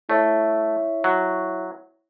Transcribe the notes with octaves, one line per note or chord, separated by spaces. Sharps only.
A3 E4 C#5 E5
F#3